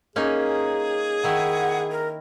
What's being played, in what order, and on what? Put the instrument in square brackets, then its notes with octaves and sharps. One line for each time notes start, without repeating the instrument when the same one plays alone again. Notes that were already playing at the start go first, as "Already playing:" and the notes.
[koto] A#3 C#4 D#4 [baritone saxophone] G#4
[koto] D#3 E4 [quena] F#5
[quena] A#4